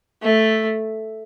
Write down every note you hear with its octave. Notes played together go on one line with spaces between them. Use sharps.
A3